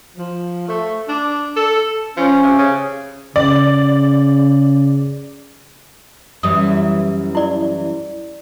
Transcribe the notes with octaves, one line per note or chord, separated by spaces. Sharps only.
F3
A3
D4
A4
F3 C#4
C3
C#3
C#3 D5
F#2 E3 G3 D#6
E4 D5